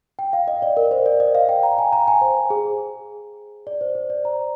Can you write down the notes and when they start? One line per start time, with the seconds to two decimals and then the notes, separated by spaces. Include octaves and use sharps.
0.19 G5
0.33 F5
0.48 D#5
0.62 D5
0.77 A#4
0.91 C5
1.06 D5
1.20 D#5
1.35 F5
1.49 G5
1.63 A#5
1.78 G#5
1.92 A#5
2.08 G#5
2.22 C5
2.50 G#4
3.67 D5
3.81 C5
3.95 C5
4.10 D5
4.25 A#5